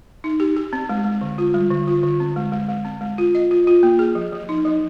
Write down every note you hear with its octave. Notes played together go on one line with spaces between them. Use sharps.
D#4
G4
G4
C4
G#3
G#3
D3
F4
G3
D3
F4
D3
C4
G#3
G#3
G#3
C4
G#3
F4
D#5
F4
F4
A#3
G#4
F3
F3
D#4
F3